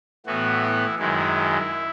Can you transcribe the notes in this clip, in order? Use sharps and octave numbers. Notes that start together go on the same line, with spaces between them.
A2 E3 B3 F#4
E4
F#2 D#3 G#3 E4